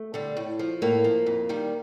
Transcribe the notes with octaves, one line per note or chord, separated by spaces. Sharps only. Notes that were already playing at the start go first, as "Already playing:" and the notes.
Already playing: A3
D3 G3
A2
F3
A2 A#3
F3
F2
D#3 G3